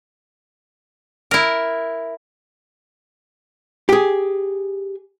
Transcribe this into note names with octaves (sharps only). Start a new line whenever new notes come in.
E4 A#4
G4 G#4